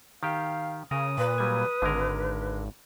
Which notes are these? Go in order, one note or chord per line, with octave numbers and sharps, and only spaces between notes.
D#3 G4 F5
C#3 A#4 D#6
A#2 B4
F#3 G3 G#5
G#1 D3 G#3 A#4